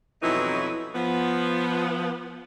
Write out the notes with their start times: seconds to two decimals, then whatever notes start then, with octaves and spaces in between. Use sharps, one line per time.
0.22 F2 B2 E3 F#3 D#4 E4
0.95 F3 B3